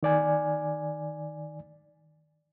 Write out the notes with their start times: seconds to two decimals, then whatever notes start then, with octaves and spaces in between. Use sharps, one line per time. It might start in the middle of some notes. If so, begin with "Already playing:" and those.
0.03 D#3 D5 G#5